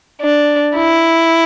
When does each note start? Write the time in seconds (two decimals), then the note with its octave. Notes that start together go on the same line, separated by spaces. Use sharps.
0.21 D4
0.76 E4